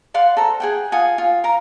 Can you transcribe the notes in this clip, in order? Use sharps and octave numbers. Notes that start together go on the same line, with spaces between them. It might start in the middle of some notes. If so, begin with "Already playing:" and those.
D5 F5 F#5 C6
A4 C5 A#5
G#4 F#5 G5
F4 F#5 G#5 D#6
F4
A#4 F5 A#5